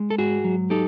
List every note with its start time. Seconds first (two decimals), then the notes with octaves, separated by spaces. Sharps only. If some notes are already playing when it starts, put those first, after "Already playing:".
Already playing: G#3
0.10 A4
0.18 G#2 F#4 G#4
0.44 F#3
0.70 D#4 G4 A4